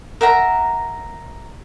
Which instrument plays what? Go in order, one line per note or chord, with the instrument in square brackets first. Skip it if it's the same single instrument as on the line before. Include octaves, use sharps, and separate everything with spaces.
[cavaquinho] A#4 E5 F#5 A#5